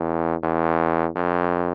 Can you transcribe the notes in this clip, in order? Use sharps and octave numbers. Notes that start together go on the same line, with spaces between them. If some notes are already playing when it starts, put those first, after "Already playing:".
Already playing: E2
E2
F2